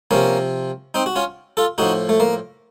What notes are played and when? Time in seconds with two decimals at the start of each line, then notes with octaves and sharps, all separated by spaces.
0.11 C3 F3 A#3 C#4
0.94 C4 D#4
1.06 F#4
1.16 C#4 F4
1.57 F4 A4
1.78 A2 F3 D#4 F#4
2.09 A3
2.20 A#3